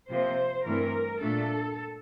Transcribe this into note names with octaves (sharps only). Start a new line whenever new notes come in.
C3 F3 A#3 C5
G2 E3 A3 C4 A#4
A#2 A3 D4 A4